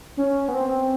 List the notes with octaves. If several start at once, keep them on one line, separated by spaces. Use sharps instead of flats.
C#4
B3
C4